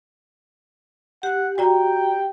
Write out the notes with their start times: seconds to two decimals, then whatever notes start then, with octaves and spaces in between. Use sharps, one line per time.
1.23 G4 F#5
1.58 F#4 D5 G5 A#5